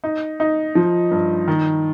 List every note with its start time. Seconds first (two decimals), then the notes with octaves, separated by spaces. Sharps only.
0.04 D#4
0.40 D#4
0.75 F3
1.11 G2
1.48 D#3